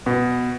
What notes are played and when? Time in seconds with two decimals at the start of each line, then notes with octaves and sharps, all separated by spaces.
0.06 B2